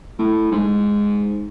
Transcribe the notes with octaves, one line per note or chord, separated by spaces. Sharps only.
A2
G#2